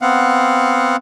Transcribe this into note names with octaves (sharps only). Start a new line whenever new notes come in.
B3 C4 F5 F#5